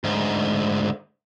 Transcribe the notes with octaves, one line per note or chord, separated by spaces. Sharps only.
D2 G#2